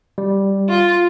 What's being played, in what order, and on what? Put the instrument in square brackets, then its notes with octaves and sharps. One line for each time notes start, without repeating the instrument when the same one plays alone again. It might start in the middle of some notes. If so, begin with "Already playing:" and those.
[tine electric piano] G3
[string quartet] F4